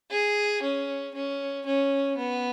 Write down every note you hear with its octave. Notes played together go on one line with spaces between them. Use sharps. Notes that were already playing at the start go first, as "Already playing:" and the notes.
G#4
C#4
C#4
C#4
B3